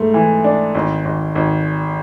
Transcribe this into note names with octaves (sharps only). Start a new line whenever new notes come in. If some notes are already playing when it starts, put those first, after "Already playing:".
Already playing: G#2 A3
E3
D4
G#1
G#1
G#1